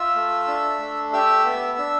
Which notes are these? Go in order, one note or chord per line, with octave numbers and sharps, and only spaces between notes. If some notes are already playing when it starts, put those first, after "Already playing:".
Already playing: F4 E5 E6
A3
D4
A3
G4 E5 E6
B3
D4